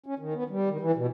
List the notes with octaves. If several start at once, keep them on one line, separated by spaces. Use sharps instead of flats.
C#4
D#3
B3
G3
D#3
E3
B2